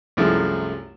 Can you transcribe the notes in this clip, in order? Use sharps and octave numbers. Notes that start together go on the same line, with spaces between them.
C2 F#2 F3 G#3 A3 E4